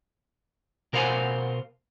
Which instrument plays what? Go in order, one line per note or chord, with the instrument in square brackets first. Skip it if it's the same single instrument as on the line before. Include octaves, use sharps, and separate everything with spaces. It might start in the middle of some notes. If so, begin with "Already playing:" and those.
[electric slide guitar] B2 A#4 C5 F5 F#5 G#5